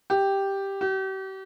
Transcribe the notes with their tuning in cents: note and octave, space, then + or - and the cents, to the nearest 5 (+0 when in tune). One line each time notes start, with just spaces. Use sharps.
G4 +0
G4 -40